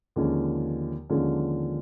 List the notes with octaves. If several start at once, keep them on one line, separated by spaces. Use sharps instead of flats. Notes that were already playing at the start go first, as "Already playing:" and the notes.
D#2 D3 F3 G#3 C#4
D#2 D3 F3 G#3 C#4